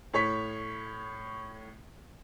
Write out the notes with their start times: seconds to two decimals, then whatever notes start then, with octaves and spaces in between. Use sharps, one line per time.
0.13 A2 C#5 C#6 B6